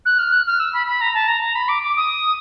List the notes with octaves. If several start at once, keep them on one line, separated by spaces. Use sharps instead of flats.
F#6
F6
F#6
F6
E6
B5
B5
A#5
A5
A#5
A#5
B5
D6
D6
D#6